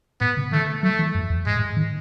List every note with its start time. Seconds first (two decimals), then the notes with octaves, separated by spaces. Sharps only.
0.21 A2 B3
0.37 C#3
0.52 D#3 A3
0.83 F#3 A3
0.99 E3
1.15 F#2
1.30 E2
1.46 G#2 G#3
1.56 A2
1.77 D#3